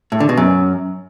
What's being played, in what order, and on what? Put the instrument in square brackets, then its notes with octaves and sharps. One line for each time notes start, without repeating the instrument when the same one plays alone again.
[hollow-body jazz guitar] A2
D3
B2
F#2